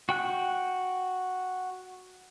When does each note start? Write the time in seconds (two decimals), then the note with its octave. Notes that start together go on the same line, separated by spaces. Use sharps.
0.09 F#4 G5 F#6